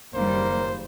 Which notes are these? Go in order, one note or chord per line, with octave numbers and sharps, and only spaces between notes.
F#1 D#2 G3 A#3 C5